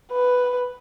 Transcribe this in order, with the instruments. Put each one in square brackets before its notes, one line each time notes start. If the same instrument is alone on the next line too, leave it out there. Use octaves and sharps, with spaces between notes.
[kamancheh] B4